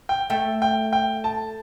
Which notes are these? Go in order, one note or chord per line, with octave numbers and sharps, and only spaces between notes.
G5
A3 G5
G5
G5
A5